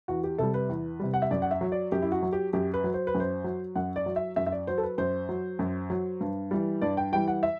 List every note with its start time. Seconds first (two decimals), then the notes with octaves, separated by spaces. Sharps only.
0.08 E2 F#4
0.24 G4
0.38 C3 G3 A4
0.54 B4
0.69 E2
1.00 C3 G3
1.14 F#5
1.22 E5
1.31 F#2 D5
1.42 F#5
1.51 E5
1.61 F#3
1.72 D5
1.92 F#2 G4
2.02 E4
2.12 F#4
2.23 F#3
2.33 G4
2.53 F#2 G4
2.74 B4
2.84 F#3
2.94 C5
3.07 B4
3.15 F#2
3.20 C5
3.44 F#3
3.75 F#2 F#5
3.96 D5
4.06 F#3
4.16 E5
4.36 F#2 E5
4.47 E5
4.52 D5
4.67 F#3 C5
4.78 A4
4.83 B4
4.98 F#2 C5
5.29 F#3
5.59 F#2
5.90 F#3
6.21 G2
6.51 E3 G3
6.82 G2 D5
6.97 G5
7.12 E3 G3 G5
7.28 F#5
7.43 E5